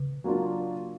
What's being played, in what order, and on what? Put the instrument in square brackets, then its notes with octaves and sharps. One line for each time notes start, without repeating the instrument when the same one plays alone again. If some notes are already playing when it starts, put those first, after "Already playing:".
Already playing: [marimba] C#3
[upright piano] F#3 A#3 D4 F4